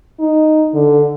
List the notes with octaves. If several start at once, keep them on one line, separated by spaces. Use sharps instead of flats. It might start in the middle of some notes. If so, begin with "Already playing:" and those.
D#4
D3